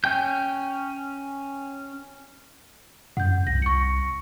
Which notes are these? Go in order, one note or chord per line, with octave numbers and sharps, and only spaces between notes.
C#4 G5 G6
F#2 F#5 G6
C2 A#6
C#6 C#7